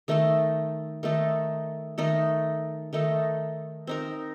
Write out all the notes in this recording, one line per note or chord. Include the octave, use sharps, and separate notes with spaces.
D#3 A3 D#4 A4
D#3 A3 D#4 A4
D#3 A3 D#4 A4
D#3 A3 D#4 A4
C4 D#4 A#4